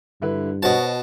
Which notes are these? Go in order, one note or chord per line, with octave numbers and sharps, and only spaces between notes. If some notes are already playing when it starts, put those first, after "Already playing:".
G2 D3 E4 B4
B2 F#4 C5 C#5 D#5 F#5 A5